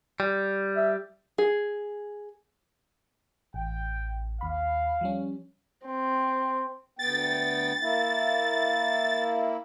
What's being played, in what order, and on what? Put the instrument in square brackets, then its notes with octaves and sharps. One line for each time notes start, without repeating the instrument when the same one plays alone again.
[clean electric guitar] G3
[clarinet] E5
[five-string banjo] G#4
[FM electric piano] A1 [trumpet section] G5
[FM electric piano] D#2 B5 [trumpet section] F5
[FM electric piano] F3 G3 C#4
[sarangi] C4
[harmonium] D2 B3 G5 [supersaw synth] A6
[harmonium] A#3 E4